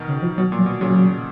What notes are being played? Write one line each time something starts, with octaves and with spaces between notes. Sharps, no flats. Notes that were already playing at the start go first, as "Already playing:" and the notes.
Already playing: B2 D#3
C#3
F3
B2 F#3
A#2
F#3
B2
A#2 C#3 F#3